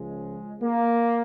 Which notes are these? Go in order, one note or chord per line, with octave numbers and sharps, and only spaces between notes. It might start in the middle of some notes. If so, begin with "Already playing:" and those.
Already playing: C#2 C#3 F3 G#3
A#3